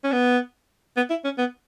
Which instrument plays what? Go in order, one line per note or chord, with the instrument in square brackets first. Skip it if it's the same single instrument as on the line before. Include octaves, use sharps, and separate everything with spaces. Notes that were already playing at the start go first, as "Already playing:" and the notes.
[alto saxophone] C#4
B3
B3
E4
C#4
B3